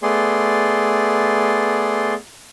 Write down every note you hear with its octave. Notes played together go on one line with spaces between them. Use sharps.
A3 B3 G#4 D5 C6